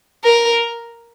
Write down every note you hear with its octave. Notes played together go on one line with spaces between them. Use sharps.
A#4